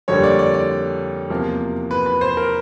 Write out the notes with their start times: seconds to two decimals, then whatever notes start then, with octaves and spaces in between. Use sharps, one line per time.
0.08 F2 D3 G3 A#3 D4 C#5
0.23 D5
0.39 D5
0.54 D5
1.30 E2 C3 F3 A#3
1.91 B4
2.06 B4
2.21 C5
2.37 A#4